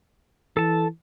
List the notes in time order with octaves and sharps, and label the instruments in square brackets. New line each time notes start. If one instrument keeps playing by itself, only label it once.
[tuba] E3 [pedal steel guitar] A4 A5